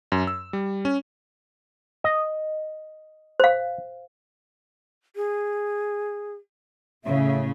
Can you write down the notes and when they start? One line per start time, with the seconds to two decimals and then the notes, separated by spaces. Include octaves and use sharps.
0.12 F#2
0.27 E6
0.53 G3
0.85 C#4
2.04 D#5
3.40 C5 F5
5.16 G#4
7.05 A2 C#3 E5